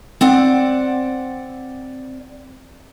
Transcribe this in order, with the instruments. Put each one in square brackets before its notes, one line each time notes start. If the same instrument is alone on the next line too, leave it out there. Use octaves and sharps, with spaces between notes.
[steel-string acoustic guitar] C4 D5 F#5